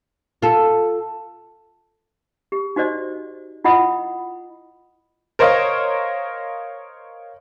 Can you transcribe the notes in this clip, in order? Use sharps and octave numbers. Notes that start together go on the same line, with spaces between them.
F4 A4
G4
D#4 F#4 C5 D5 D#5
E4 F4 D#5 F#5 B5 D#6
A#4 C5 C#5 D#5 F5